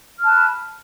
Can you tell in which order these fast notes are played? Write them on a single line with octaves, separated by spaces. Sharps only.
F6 A5 F#6 B5